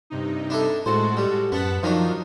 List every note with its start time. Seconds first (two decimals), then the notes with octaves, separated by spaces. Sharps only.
0.10 G2 C3 D#4
0.50 D4 E4 A4
0.86 A2 G#3 F#4 A4 C5
1.17 G3
1.52 F#2 B3 F#5 A5 B6
1.83 D#3 F3 F#3 D4 D#4 F4